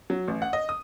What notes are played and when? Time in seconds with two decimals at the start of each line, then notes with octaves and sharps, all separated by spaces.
0.10 F#3
0.28 A1
0.42 F#5
0.53 D#5
0.69 D#6